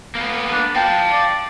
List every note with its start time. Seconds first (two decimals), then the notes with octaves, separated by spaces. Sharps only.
0.15 A#3 B3
0.52 D4
0.76 F5 G5 A5
1.12 D5